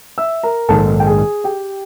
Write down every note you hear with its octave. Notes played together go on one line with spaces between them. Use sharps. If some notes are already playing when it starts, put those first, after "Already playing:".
E5 E6
A#4 A#5
A#1 G#2 D#3 A4 A5
G5
G#4 G#5
G4 G5